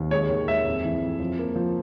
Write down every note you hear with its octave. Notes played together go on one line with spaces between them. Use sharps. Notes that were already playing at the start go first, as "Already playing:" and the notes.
Already playing: D#2
G#3 C#5
D#3
G#3 E5
F2
E3
F2
F3
A#3
F3